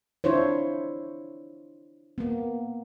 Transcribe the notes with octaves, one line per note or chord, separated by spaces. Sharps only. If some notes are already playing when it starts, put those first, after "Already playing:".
D4 E4 F4 C5 C#5
A#3 B3